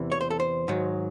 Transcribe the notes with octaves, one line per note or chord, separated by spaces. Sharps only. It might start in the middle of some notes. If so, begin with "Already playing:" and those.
Already playing: E2 C3 E3
C#5
C5
A4
C5
G#2 D#3 F#3